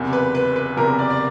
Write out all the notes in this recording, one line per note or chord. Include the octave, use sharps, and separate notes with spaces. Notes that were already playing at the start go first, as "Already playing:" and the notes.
Already playing: F#1 E2 C3
B4
B4
B4
F#1 E2 C3 A#4
D5
D5